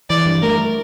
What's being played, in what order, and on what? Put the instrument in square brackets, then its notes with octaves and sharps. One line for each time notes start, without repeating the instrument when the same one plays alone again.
[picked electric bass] E3 [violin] D5
[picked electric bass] G2
[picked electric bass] A3 [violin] A#4